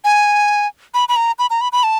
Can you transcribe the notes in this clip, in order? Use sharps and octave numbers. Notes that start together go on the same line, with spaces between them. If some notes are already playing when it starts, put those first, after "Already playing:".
G#5
B5
B5
A#5
B5
A#5
B5
B5
A5